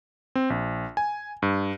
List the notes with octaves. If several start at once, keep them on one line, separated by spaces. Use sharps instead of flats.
C4
A#1
G#5
G2